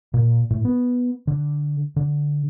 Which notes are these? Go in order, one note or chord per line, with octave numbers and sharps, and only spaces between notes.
A#2
A2
B3
D3
D3